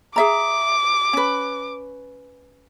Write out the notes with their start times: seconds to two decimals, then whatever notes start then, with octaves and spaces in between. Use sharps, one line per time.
0.16 G#4 E5 A#5 D6
1.13 C#4 B4